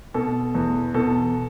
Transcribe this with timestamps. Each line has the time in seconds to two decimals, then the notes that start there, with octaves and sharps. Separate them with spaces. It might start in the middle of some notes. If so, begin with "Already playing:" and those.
0.14 B2 A4
0.55 E2
0.94 B2 A4